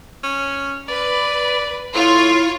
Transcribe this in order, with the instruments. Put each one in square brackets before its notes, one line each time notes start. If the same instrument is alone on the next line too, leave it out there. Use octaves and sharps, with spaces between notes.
[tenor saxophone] C#4
[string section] B4 [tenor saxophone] D5
[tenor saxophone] A2 [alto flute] E4 [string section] F4 C#5